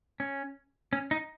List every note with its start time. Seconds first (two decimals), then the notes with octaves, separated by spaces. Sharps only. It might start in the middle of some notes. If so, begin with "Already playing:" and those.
0.20 C#4
0.93 C#4
1.11 D#4